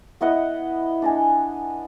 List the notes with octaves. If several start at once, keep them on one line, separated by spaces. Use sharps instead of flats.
B3 E4 D#5 F#5
D4 D#5 G#5